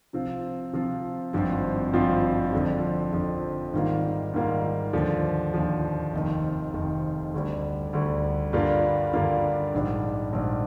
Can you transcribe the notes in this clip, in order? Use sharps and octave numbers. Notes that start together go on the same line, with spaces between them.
C3 F3 C4 F4
C3 F3 C4 F4
G#1 G2 F3 C4 F4
G#1 G2 F3 C4 F4
F2 D3 F3
F2 D3 F3
G#2 D#3 G3 A#3 F4
G#2 D#3 G3 A#3 F4
D#2 D3 F3
D#2 D3 F3
F1 F2 D#3
F1 F2 D#3
D2 D3 G3
D2 D3 G3
G2 D3 G3 A#3 F4
G2 D3 G3 A#3 F4
A#1 G#2 G3 D4
A#1 G#2 G3 D4